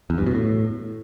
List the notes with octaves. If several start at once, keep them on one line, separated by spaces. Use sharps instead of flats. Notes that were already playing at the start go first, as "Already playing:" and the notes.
E2
G2
B2
A2